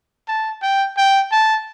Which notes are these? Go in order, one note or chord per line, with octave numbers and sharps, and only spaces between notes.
A5
G5
G5
A5